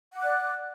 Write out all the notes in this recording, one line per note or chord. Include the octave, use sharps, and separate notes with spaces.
D5 F#5 D6 F#6